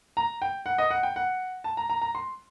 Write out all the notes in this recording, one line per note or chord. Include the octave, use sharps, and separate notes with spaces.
A#5
G5
F#5
D#5
F#5
G5
F#5
A5
A#5
A#5
A#5
C6